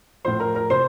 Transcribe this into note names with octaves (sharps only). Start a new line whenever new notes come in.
A2 F3 C5 C6
A#4 A#5
A#4 A#5
C3 C5 C6